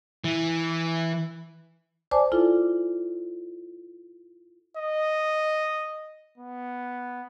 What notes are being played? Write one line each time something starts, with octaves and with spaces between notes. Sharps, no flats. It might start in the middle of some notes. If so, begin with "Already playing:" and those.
E3
C5 D5 G#5 A5 D6
E4 F4 A4
D#5
B3